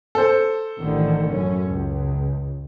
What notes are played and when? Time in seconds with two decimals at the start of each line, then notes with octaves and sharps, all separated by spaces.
0.15 A4 C5
0.79 A1 D3 D#3
1.30 F#2 C#4
1.66 C#2